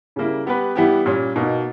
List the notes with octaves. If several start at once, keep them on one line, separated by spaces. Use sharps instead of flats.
C#3 G3 A#3 E4
G3 B3 G4 B4
E3 G3 B3 E4 G4
A#2 G3 C#4
B2 A#3 D#4